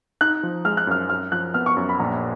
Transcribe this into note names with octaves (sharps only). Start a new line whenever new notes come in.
D#4 F#6
F3
G#3 F6
F#6
F#2 F6
F#2 F6
F3 F#6
B3 F6
C#6
F#2
B5
A#1 A#5